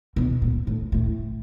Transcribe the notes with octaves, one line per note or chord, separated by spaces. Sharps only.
B2
A#2
A2
A2